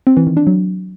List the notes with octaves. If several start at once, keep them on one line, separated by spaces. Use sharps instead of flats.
C4
E3
D#3
D4
F#3